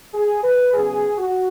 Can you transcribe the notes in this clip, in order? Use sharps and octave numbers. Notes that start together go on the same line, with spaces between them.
G#4
B4
C#3 F#3 B3 G#4
F#4